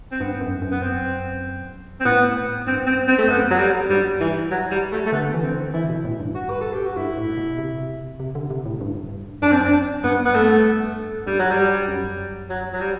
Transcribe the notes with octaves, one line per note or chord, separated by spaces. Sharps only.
C4
G2 B3
F#2
F#2
B3
C4
C4
A2 B3
G2 C4
C4
C4
A3
F#2 B3
F#3
G3
G2 G3
E3
F#3
G3
A3
A3
D3 B3
E3
D3 C4
E3 E4
B2
A2
G2
F#4
B4
A4
G4
F#4
G2 E4
A2
B2
C3
C3
D3
C3
A2
G2
F#2 D4
C4
D4
G2 B3
B3
A3
G2 G3
F#3
G3
F#2
F#3
F#3
G3